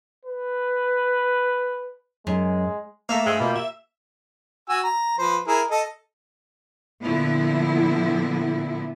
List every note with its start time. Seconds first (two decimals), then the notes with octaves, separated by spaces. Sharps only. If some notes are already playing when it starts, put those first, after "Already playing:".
0.25 B4
2.27 F#2 G#3
3.09 A3 A#3 E5 F5
3.26 G2 G#3 C5 G#5 E6
3.40 B2 A#3 F4 G4
3.56 E5
4.69 F#4 G#5 E6
4.84 A#5
5.18 F3 B4 C5
5.47 E4 G#4 A#4
5.71 A4 D#5
7.02 A#2 D3 F3 B3 E4